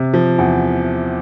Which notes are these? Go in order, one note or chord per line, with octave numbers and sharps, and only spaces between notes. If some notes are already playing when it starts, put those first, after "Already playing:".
Already playing: C3
F3
E2